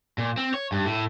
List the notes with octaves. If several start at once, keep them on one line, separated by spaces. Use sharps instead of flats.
A#2
C4
C#5
G2
A2